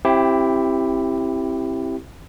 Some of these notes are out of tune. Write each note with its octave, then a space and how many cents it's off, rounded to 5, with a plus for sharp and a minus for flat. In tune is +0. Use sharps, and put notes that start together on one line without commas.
C4 +25 E4 +10 G4 +0